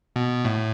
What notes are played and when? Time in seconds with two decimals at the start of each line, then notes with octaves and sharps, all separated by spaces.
0.16 B2
0.45 A2